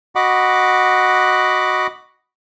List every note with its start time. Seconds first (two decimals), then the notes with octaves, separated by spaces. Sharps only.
0.15 F#4 D#5 F#5 B5 D6